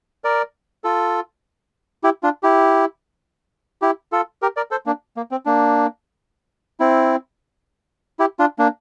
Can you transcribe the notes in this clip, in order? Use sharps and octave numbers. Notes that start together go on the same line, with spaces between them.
A#4 D5
F4 A4
E4 G4
D4 F4
E4 G4
E4 G4
F4 A4
G4 A#4
A#4 D5
A4 C5
A#3 D4
A#3
C4
A#3 D4
C4 E4
E4 G4
D4 F4
A#3 D4